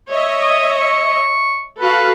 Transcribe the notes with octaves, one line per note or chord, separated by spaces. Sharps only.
C#5 D#5 E5
D#6
C#6
F#4 A4 B4 F5